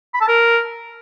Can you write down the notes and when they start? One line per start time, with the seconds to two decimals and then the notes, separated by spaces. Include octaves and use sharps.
0.14 B5
0.21 A5
0.28 A#4